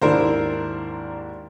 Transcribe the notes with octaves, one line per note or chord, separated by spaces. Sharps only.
D#2 G#2 D4 E4 A#4 C5